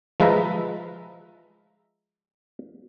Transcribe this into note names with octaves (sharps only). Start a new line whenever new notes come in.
F3 G#3 F4 B4 E5 A#5